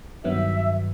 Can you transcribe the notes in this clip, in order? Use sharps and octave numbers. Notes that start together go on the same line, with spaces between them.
G2 D#3 F#3 B3 E5